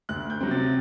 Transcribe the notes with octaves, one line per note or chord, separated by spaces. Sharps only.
D2 F#6
G6
C3 F#3 C4
A6